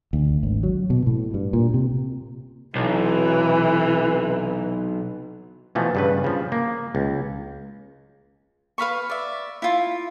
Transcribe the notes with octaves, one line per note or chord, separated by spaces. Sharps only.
D2
G#1
F#3
B2
A2
G2
A#2
C3
B1 C3 E3
B2 E3 F3 A3
G2 C#3 B4
C#3 F3
A#3
C#2
B4 F5 B5 C#6
D5 E5
E4 F4